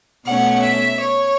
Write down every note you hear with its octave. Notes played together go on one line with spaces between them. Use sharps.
B2 A3 C#4 F#5
E5
C#5